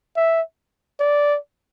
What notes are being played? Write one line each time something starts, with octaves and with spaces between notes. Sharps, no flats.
E5
D5